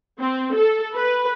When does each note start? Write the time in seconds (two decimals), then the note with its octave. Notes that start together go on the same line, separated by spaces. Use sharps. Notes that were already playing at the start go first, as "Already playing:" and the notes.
0.19 C4
0.54 A4
0.95 B4